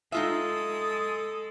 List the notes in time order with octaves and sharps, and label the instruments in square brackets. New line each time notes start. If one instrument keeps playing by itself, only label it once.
[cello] G#3 A4 [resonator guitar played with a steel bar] D#4 F4 E5 [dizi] D#6